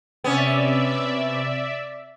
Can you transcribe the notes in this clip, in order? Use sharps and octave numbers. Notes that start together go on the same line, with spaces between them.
C3 B3 C#4 D5 E5